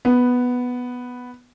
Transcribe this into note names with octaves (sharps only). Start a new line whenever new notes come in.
B3